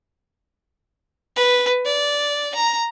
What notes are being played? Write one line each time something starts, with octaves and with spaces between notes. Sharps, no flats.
B4
D5
A#5